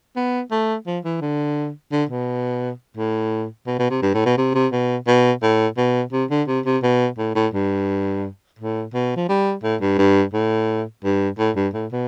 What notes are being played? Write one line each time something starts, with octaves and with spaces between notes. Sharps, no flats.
B3
A3
F3
E3
D3
D3
B2
A2
B2
B2
C3
G2
A2
B2
C3
C3
B2
B2
A2
B2
C3
D3
C3
C3
B2
A2
A2
G2
A2
B2
F3
G3
A2
G2
G2
A2
G2
A2
G2
A2
B2